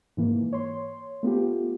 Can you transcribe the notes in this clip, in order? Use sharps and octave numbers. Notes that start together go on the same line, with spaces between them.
G#2 E3 A#3
C#5 C6
A3 B3 F4 G4